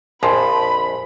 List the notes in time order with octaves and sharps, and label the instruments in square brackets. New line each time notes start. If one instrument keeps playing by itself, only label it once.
[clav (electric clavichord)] A#1 F2 [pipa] F3 [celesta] G#5 C6 [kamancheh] B5